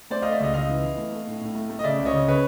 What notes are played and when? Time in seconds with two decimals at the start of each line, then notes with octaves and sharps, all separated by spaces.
0.10 A3 C5 D5
0.22 A3 D#5 F5
0.32 D5 E5
0.40 C#2 D#5 F5
0.54 C#2 D#5 F5
0.69 E3
0.84 E3
0.97 A3
1.12 A3
1.27 A2
1.41 A2
1.55 A3
1.70 A3
1.79 D#5
1.84 C#3 D5 E5
1.99 C#2
2.05 C#5 D#5
2.13 C#3
2.28 C#3 B4 C#5